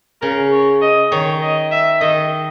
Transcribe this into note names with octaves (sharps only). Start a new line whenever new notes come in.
C#3 A#4
C#5
D#5
D#3 C#5
D#5
E5
D#3 D#5